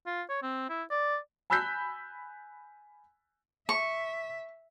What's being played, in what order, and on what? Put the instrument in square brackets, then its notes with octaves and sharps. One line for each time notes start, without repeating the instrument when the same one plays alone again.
[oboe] F4
C#5
C4
E4
D5
[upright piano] G#5 B5 E6 F#6 G6 B6
[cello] E5 [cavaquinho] C#6